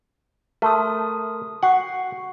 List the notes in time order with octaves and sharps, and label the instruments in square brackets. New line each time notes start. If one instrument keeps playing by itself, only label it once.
[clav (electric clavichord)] A3 [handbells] A#4 C6 D#6
[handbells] F#4 C#6 C7 [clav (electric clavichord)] F#5